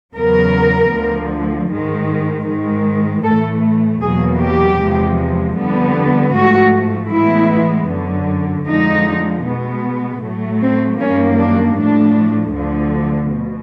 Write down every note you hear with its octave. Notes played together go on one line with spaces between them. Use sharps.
E2 C#3 F#3 B3 A#4
D2 D3 F3
G#2 D#3 G#3
G#2 D#3 G#3
A2 E3 A3 A4
E2 B2 F#3 A#3 G#4
G4
E2 C3 F3 G#3
F2 D3 G3 B3
G#2 F3 A3 F#4
A2 E3 G#3 B3 E4
F#2 D3 F#3
F2 D3 F3 G#3 D#4
B2 G#3 B3
A2 F#3 A3
C4
F#2 D#3 G3 A#3 C#4
D4
A2 F3 A3 D4
D2 D3 F3
B2